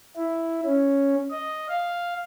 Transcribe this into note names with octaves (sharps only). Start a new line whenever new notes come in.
E4
C#4
D#5
F5